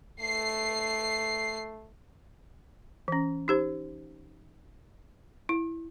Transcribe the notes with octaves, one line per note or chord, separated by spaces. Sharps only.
A3 C7
E3 C#4
D#4 G4 C5
E4